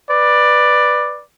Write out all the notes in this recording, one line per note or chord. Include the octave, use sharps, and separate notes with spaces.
B4 D5